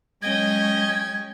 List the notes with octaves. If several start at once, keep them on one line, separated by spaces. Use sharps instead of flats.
F#3 G#3 C#4 D#5 G5 G#6